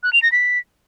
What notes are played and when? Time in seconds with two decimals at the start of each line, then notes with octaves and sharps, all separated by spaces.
0.03 F#6
0.13 F7
0.22 A#6
0.32 B6